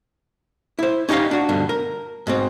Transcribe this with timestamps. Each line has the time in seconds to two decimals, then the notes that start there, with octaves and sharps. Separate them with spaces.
0.79 E4 C5
1.09 C#4 D#4 G4 D#5 F5
1.31 D4 F#4
1.49 G2 B2 D3
1.69 A#4
2.27 G#2 B2 C4